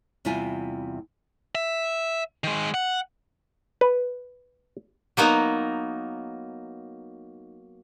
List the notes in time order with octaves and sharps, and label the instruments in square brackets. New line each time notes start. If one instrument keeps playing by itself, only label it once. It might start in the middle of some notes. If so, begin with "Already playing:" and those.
[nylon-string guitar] E2 C3 G3 E4 F4 G#5
[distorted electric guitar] E5
D#3 G#3
F#5
[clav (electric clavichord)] B4
[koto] F#3 A#3 B3 D#4